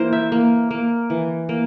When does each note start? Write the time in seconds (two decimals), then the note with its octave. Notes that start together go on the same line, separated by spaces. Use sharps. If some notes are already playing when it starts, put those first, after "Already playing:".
Already playing: E3 A#3 E4 A#4 C5
0.13 E5
0.32 A#3
0.71 A#3
1.10 E3
1.49 A#3